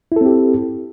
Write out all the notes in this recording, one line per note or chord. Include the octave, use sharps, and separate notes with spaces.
C4 E4 G4 A4